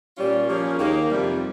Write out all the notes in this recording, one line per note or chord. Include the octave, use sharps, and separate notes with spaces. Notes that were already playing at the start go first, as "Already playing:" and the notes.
A#2 G3 C#4 F4
F3 A#3 C#4 G#4
D#2 D#3 A#3
F2 C3 G3